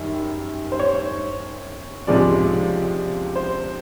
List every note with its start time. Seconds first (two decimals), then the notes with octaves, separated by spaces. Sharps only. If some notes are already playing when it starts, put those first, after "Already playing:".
Already playing: F#2 D#3 G3
0.72 C5
0.79 C#5
2.07 C#2 C3 F3 G#3 D5
3.36 C5